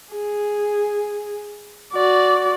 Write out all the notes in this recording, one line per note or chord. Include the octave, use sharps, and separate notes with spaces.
G#4
F#4 D5